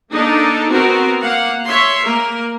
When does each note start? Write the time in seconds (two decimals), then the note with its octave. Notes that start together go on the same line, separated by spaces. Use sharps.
0.12 A#3 D4 D#4 A4
0.68 B3 C4 F#4 A#4
1.21 A#3 F5 F#5
1.65 C#5 E5 C6
2.03 A#3 A#4